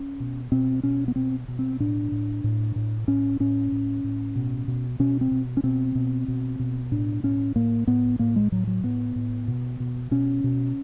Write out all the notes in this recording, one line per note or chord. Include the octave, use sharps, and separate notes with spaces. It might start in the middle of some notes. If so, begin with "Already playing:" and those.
Already playing: C#4
B2
B2 C4
B2 C#4
B3
B2 C4
B2
C4
A2 D4
A2
A2
A2
A2 C#4
A2 C#4
A2
A2
B2
B2
B2 C#4
C4
B2
C#4
B2 C4
B2
B2
B2
A2 D4
A2 C#4
A2 A#3
A2 B3
A2 A#3
G#3
A2 F#3
F#3
A2 B3
A2
B2
B2
B2 C#4
B2